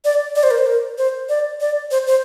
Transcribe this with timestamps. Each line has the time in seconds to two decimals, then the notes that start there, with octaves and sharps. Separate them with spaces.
0.05 D5
0.36 D5
0.43 C5
0.51 A#4
0.58 C5
0.67 A#4
0.98 C5
1.29 D5
1.61 D5
1.91 C5
2.07 C5